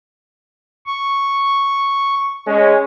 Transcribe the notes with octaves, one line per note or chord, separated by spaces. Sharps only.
C#6
G#3 C#4